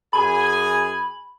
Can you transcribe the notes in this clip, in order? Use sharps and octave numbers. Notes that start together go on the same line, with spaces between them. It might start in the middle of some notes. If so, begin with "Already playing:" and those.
F#2 G#4 G#5 B5